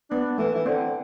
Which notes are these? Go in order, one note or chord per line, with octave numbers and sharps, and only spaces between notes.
B3 D4
E3 A3
E3
D3 C4